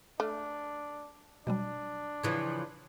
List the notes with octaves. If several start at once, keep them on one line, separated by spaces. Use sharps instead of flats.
A3 D4 D6 F6
B2 F#3 G3 D4
C#3 E3 F3